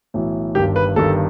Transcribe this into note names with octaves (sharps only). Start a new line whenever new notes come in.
B1 A2 E3
G1 G2 D#3 G4
B4
G1 G2 D#3 A4